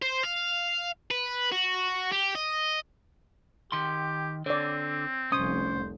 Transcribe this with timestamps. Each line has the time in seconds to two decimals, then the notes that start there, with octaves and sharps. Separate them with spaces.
0.02 C5
0.23 F5
1.11 B4
1.52 F#4
2.12 G4
2.35 D#5
3.72 D#3 G4 C6
4.46 D3 C4 C#5 D5
5.32 F1 C2 C#4 C5 D#6